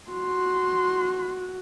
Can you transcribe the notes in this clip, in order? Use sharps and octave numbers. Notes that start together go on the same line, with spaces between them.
F#4 C6